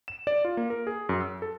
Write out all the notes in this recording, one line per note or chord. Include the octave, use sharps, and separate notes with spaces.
E7
D5
F4
A#3
A#4
G#4
F#2
E6
A4